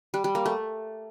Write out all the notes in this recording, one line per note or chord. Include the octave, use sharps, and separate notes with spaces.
G3
G3
A#3
A3